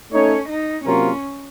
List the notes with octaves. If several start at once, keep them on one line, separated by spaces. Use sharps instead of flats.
A3 C#4 D#4 A4 C#5
D#4
C3 F#3 A#3 C#4 F4 A#4